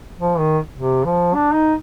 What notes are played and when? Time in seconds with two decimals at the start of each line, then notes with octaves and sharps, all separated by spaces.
0.19 F3
0.38 D#3
0.76 C3
1.05 F3
1.34 D4
1.54 D#4